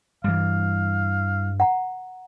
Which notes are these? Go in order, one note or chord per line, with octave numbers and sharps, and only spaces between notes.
G2 E3 G3 F5
F#5 A#5